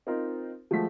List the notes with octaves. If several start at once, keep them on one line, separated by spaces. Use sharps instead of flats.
C4 D#4 F4 A#4 C5
F3 G#3 A3 F#4 B6